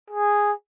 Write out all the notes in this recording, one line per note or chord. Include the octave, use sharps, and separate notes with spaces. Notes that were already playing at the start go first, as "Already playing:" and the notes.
G#4